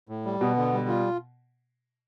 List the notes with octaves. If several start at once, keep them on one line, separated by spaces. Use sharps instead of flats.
A2
G3
B2 B3
D3
G3
F4